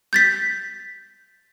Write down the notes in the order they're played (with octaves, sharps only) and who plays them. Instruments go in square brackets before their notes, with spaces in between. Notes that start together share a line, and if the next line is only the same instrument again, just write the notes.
[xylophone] G6 A6 B6